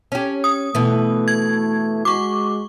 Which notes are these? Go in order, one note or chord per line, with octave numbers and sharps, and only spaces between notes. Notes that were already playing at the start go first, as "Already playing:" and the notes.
C#4 G4
D#6
B2 E3 A3
G#6
G#3 F#4 C#6 D6